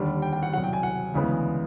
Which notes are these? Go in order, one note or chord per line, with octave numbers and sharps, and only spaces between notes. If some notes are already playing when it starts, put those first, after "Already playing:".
Already playing: D#2 D3 G3
G5
G5
F#5
C2 B2 F#3 F#5
G5
G#5
F#5
D2 C#3 E3 G#3 B3